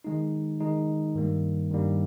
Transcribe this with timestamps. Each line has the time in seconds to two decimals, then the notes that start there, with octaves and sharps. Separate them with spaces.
0.04 D#3 G#3 D#4
0.60 D#3 G#3 D#4
1.15 G2 D#3 G3 A#3
1.70 G2 D#3 G3 A#3